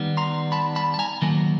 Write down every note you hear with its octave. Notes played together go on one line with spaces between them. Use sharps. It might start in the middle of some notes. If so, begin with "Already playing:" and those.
Already playing: D#3 G3 B3 D#4
A#5 C6
A5 B5
A5 B5
A5
G#5 A#5
D#3 F#3 A#3